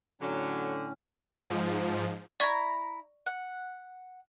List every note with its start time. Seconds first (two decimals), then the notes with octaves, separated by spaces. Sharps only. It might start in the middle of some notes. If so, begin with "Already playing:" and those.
0.22 A2 D3 F#3 C#4
1.50 G#2 F3
2.40 E4 D5 A#5 C#6 G#6
3.26 F#5